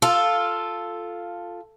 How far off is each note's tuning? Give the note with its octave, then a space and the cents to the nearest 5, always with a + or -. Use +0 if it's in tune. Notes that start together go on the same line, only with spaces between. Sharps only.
F4 +0 A4 +0